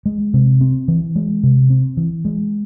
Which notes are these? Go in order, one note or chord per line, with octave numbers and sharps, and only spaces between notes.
G#3
C3
C4
E3
G#3
C3
C4
E3
G#3